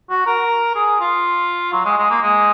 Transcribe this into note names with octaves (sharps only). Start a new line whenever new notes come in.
F#4
A#4
G#4
F4
F#3
G#3
G#3
A#3
G#3